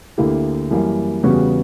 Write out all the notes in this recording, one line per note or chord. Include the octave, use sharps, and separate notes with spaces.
D2 D3 A#3 E4 G4
F#2 E3 G3 A#3
E2 C#3 G3 B3 F#4